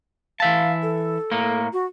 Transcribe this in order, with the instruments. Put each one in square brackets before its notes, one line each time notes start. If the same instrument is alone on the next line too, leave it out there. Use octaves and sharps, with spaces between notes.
[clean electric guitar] E3 E5 A5 [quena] F5
[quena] A4
[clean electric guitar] A2 A#3
[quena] F#4